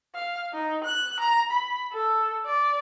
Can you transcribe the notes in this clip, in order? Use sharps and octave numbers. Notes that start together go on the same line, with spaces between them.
F5
D#4
F#6
A#5
B5
A4
D5